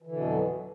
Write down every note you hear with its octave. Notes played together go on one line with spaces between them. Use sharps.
F2 B2 D3 E3 F#3